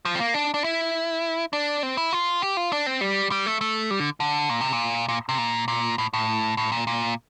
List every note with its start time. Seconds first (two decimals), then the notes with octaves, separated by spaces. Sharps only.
0.05 F3
0.15 C4
0.20 A#3
0.34 D4
0.54 D4
0.64 E4
1.53 D4
1.83 C4
1.97 E4
2.13 F4
2.42 G4
2.57 F4
2.72 D4
2.86 C4
3.01 G3
3.31 G3
3.46 A3
3.61 A3
3.91 G3
4.00 D3
4.20 D3
4.50 A#2
4.61 C3
4.73 A#2
5.09 A#2
5.29 C3
5.38 A#2
5.68 A#2
5.98 A2
6.13 A2
6.57 A2
6.72 A#2
6.87 A#2